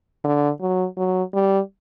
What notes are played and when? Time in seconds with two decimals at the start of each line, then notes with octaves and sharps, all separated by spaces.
0.24 D3
0.61 F#3
0.97 F#3
1.34 G3